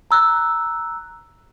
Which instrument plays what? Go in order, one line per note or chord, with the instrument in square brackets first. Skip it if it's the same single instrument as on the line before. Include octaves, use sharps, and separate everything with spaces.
[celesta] A#5 E6 F#6